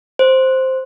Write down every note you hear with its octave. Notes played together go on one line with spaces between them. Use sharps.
C5